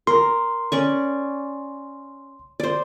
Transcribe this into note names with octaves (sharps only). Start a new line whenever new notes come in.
A#4 C6
C#4 D5 C#6
C5 D5